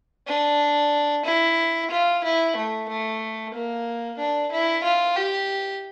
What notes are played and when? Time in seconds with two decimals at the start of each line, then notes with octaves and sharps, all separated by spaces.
0.27 D4
1.25 E4
1.91 F4
2.24 E4
2.56 A3
2.89 A3
3.54 A#3
4.19 D4
4.52 E4
4.84 F4
5.16 G4